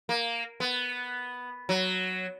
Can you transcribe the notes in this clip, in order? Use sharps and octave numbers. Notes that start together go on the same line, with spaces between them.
A#3
B3
F#3